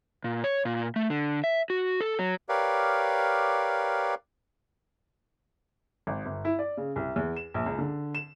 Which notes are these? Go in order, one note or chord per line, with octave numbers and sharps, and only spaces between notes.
A#2
C#5
A#2
A3
D3
E5
F#4
A4
F#3
G4 A#4 B4 C#5 D5 F5
G#1
G1
E4
D5
C#3
C2
E2
E7
A#1
C#2
D3
E7